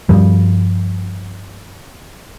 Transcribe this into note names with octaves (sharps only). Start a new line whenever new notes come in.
G2 F3 G3